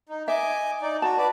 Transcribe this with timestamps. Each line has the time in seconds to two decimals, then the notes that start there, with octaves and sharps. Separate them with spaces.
0.09 D#4
0.28 D#5 E5 G#5 D6
0.82 D#4 D5
1.02 F#4 A5
1.18 B4 D5